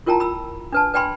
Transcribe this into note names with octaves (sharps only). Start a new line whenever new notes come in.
E4 F4 A#4 G5 A5 A#5
B5 E6
D4 B4 A5
B4 D5 G5 G#5 B5 C6